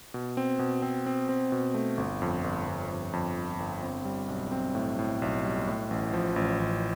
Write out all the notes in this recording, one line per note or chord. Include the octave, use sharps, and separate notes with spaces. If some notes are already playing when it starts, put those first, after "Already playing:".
B2
C4
B2
C4
C4
C4
B2
A3
G1
F2
G1
G1
F2
F2
G1
G1
C4
G3
B1
C4
A2
A2
B1
G3
A2
A1
F3
A1
A1